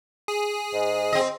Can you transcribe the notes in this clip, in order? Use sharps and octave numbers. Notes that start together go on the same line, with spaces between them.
G#4
G#2
C4 D#5